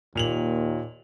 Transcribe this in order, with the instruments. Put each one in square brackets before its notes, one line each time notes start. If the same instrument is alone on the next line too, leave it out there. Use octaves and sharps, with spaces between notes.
[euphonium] D#2 [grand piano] A#2 F7 F#7